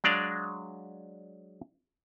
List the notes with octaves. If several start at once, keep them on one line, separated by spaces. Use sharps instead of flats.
F#3 G#3 D4 D5 F5